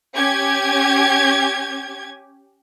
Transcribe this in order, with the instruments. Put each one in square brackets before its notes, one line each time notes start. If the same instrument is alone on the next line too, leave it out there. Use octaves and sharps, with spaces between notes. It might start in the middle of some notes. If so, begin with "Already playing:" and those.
[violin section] C#4 G4 G#6